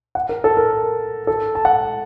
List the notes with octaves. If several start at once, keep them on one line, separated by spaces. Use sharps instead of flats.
F#5
A#4
A4
A#4
A4
A5
F#5